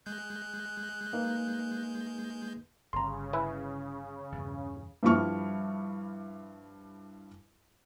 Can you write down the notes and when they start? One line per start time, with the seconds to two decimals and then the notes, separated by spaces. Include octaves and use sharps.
0.06 G#3 F#6 G6
1.13 A#3 D#4 B4
2.93 G1 C#3 A#5 C6
3.33 E4 B4 G#5
4.32 E2 G2 B2
5.03 G2 F3 G3 E4 C#6 F6